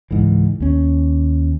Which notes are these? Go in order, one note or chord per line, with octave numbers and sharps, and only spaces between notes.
C#2 G#2 E3
D#2 C#4